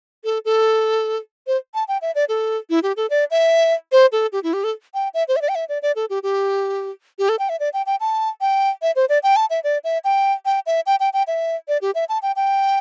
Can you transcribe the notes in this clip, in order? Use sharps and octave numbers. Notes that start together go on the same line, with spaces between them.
A4
A4
C5
A5
G5
E5
D5
A4
E4
G4
A4
D5
E5
C5
A4
G4
E4
G4
A4
G5
E5
C5
E5
D5
G5
E5
D5
D5
A4
G4
G4
G4
A4
G5
E5
D5
G5
G5
A5
G5
E5
C5
D5
G5
A5
E5
D5
E5
G5
G5
E5
G5
G5
G5
E5
D5
G4
E5
A5
G5
G5